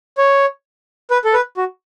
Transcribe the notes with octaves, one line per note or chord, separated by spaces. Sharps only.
C#5
B4
A4
B4
F#4